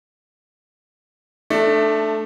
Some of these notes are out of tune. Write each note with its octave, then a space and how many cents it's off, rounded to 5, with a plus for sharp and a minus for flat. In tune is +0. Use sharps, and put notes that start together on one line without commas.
A3 +0 D4 +20